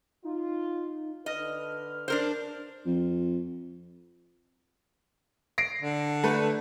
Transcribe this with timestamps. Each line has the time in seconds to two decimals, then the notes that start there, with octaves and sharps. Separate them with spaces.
0.24 D#4 F4
1.26 D3 B4 D#5 F6
2.08 D4 A#4 C5
2.86 F2
5.58 A#6 C7 D7
5.82 D3
6.24 A3 B4